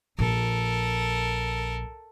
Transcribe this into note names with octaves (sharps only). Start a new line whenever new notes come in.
A#1 A4 A#4